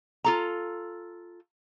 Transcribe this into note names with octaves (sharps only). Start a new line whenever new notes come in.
F4 A4 A#5